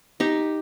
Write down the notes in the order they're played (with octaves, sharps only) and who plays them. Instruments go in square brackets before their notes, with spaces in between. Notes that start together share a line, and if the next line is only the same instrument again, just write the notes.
[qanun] D#4 G4